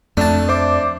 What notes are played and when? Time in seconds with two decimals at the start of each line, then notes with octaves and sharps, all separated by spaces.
0.17 F2 A3 D4 A5
0.49 C5 D5 E5 D6